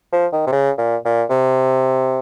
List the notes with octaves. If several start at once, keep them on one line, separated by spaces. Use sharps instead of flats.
F3
D#3
C3
C#3
A#2
A#2
C3